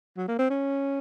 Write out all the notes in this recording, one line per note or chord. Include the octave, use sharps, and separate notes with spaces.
F#3
A#3
C4
C#4